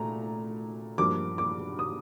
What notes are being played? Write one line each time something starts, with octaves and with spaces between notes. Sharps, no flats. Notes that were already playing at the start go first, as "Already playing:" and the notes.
Already playing: A#2 A3 A#5
G2 F3 A#3 D6
D6
D#6